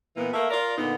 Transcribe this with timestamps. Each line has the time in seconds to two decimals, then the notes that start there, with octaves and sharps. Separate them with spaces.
0.17 A#2 E3 A#3 B3
0.34 A3 A#3 E5
0.50 F4 A#4 D5
0.77 A#2 D3 B3 D#4